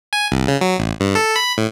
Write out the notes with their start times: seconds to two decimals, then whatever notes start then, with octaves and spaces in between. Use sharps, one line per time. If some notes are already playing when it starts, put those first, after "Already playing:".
0.13 G#5
0.32 C2
0.48 C#3
0.61 F#3
0.78 A1
1.00 G2
1.15 A4
1.36 B5
1.58 A2